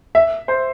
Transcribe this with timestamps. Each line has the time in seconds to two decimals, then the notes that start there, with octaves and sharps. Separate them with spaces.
0.15 E5
0.48 C5